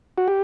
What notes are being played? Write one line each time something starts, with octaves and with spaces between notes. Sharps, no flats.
F#4
G4